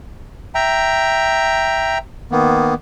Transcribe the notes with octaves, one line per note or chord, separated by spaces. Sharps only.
E5 G5 A#5
D#3 A#3 B3